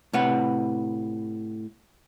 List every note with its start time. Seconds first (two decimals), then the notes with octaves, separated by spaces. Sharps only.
0.13 A2 C3 B4 F#5